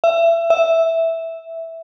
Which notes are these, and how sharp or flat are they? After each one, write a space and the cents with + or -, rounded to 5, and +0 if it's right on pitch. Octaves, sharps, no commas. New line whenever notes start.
E5 +25
E5 -5